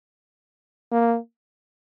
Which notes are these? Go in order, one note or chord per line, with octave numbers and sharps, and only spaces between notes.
A#3